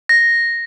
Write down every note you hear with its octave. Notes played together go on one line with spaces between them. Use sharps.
A#6